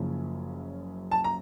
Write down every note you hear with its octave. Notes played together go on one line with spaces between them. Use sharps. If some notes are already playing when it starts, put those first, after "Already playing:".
Already playing: F#1 F#2 C#3 F3
A5
A#5